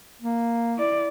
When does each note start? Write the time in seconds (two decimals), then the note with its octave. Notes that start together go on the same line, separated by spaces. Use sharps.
0.22 A#3
0.77 E4 D5